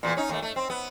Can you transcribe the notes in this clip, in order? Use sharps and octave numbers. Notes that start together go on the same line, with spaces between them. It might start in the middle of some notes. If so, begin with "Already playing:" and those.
E2 A#2
C#4 D#4
D#2 A3
A3
C4
B3